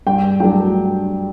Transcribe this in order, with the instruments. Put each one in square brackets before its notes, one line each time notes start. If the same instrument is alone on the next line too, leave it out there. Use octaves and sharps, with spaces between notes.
[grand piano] G2 G5
F#3 A3 D4 G5